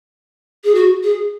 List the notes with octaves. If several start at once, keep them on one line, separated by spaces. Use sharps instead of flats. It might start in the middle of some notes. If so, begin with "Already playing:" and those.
G#4
F#4
G#4